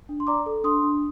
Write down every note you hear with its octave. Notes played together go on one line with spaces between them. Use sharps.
D4
C6
D5 A#5 D6
A4
D4 C6 D#6
D4